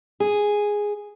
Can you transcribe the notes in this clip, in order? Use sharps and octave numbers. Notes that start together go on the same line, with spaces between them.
G#4